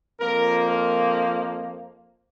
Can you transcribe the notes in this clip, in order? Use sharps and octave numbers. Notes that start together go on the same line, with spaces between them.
F2 F3 A#3 A#4
A#4